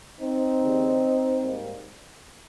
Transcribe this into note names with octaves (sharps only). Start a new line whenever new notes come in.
C4 D#4
D#2 C#3 G3
G#2 G3 A#3